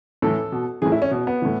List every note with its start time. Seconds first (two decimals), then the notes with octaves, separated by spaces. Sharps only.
0.22 A2 E3 A4
0.52 B2
0.82 A2 E3 G#4
0.92 E4
1.02 C#4
1.11 B2
1.27 B3
1.42 A2 E3